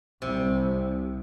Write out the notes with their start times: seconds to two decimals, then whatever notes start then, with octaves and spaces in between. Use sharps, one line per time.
0.22 C2 C3